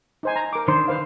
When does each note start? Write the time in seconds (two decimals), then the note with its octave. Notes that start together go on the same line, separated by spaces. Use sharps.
0.23 D#4 C5 G#5
0.36 A#5
0.53 A#4 D6
0.68 D#3 D4 C5 C6
0.88 B4 C5 F5